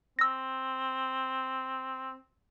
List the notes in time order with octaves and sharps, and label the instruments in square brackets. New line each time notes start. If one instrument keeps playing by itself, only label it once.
[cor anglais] C4 [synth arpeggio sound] E6 A#6